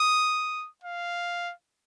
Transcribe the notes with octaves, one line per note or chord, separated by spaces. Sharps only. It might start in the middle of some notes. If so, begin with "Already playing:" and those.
Already playing: D#6
F5